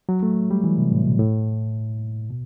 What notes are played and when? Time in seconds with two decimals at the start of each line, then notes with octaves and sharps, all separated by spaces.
0.09 F#3
0.23 A3
0.51 G3
0.64 E3
0.78 C3
0.92 A2
1.05 B2
1.19 A2
2.30 B2